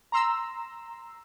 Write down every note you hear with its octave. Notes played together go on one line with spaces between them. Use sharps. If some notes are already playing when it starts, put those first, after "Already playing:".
A#5 C6 E6